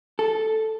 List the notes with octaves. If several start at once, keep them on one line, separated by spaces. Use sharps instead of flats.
A4